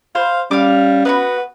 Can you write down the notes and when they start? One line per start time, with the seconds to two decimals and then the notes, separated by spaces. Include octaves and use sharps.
0.15 C5 F5
0.51 G3 C#4 F5 D6
1.05 B3 D#4 F#4 B4